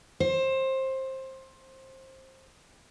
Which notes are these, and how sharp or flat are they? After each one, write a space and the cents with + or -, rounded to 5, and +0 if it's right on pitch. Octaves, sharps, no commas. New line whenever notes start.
C5 +20